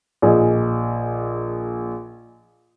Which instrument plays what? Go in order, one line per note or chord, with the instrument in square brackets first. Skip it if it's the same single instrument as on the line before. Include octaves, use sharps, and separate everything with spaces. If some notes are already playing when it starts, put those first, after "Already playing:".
[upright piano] A#1 G#4 D#5